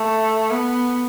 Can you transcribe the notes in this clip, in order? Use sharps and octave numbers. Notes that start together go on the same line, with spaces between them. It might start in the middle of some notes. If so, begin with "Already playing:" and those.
Already playing: A3
B3